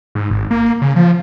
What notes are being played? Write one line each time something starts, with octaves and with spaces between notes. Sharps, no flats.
G#2
G#1
A#3
C#3
F3